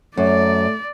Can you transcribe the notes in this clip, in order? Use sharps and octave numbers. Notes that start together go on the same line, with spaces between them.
F#2 A3 D5